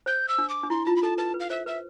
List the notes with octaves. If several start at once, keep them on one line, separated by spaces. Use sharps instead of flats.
C5 G6
E6
D4
D6
D4
E4 C6
F4 A5
B5
A4 A5
B4 A5
B4
F5
C5 E5
B4 E5